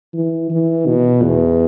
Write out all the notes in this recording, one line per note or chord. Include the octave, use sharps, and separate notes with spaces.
E3
E3
B2
E2